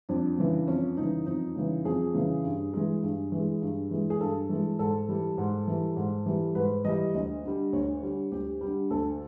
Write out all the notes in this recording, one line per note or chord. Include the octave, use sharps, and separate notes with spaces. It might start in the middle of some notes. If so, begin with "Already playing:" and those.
F2 D4
C#3 E3
F2 C#4
C#3 E3 D#4
F2 D#4
C#3 E3
F2 G#4
C#3 E3
G2
E3 G#3
G2
E3 G#3
G2
E3 G#3
G#4
G2 A4
E3 G#3
G#2 A4
E3 G3
G#2
E3 G3
G#2
E3 G3
G#2 B4
E3 G3 D#5
D2 D#5
D3 G3
D2 C#5
D3 G3
D2 G4
D3 G3
D2 A4